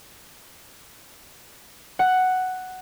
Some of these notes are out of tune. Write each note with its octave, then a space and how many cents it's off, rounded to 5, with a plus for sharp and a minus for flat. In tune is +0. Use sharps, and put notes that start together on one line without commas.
F#5 +5